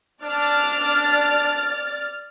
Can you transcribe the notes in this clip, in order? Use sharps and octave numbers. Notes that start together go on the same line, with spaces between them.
D4 D5 F6 A6